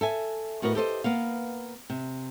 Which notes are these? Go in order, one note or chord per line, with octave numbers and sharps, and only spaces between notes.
A4 E5 G#5
A2 F#4 A#4 B4 D#5
G4 A4 C5 D#5
A#3 B3 F5
C3